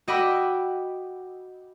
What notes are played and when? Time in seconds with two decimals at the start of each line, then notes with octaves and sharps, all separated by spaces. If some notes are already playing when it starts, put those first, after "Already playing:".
0.08 F#4 D#5 G5 B5 D6 E6